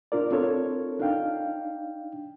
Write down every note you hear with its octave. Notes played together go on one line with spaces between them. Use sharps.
D4 F4 A#4 D5
C4 D4 F4 A4 A#4 C#5
D4 D#4 F5 G5